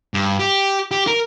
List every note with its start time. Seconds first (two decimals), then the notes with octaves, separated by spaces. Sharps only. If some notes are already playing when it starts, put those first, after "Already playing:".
0.14 G2
0.39 G4
0.91 G4
1.07 A#4